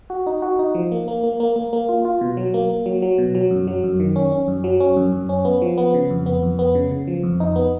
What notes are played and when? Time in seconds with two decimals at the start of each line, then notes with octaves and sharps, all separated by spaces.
0.10 F#4
0.26 D#4
0.42 F#4
0.59 D#4
0.75 F3
0.92 A#3
1.08 A#3
1.24 A#3
1.40 A#3
1.56 A#3
1.73 A#3
1.89 F4
2.05 F4
2.21 B2
2.37 F#3
2.54 A#3
2.69 A#3
2.86 F#3
3.02 F#3
3.18 B2
3.35 F#3
3.51 F#2
3.67 F#3
3.84 F#2
4.00 D#3
4.16 C#4
4.32 C#4
4.48 F#2
4.64 F#3
4.80 C#4
4.97 F#2
5.13 F#2
5.29 C#4
5.45 B3
5.62 F3
5.78 B3
5.94 C#3
6.10 F2
6.26 B3
6.43 F2
6.59 B3
6.75 C#3
6.91 C#3
7.07 F3
7.23 F2
7.40 D#4
7.56 B3